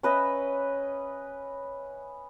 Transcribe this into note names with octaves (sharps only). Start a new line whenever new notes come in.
C#4 B4 D#5 E5